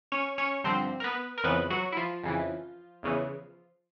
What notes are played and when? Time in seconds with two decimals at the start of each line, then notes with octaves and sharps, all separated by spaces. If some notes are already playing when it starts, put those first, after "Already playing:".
0.12 C#4 C#5
0.38 C#4 C#5
0.64 G2 D3 F3 C4 C5
1.00 A#4
1.04 B3 B4
1.38 A#4
1.44 F2 C#3 E3 B3 B4
1.70 F#3 F#4
1.92 E4
1.97 F3 F4
2.23 F2 C#3 E3
3.03 E2 C#3 E3